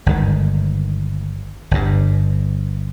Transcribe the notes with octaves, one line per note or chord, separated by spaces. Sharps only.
G1 G#2 D#3
G1 G2